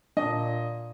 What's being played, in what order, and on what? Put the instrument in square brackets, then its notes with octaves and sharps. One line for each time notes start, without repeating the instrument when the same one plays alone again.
[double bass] A#2 [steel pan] D4 [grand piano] D#5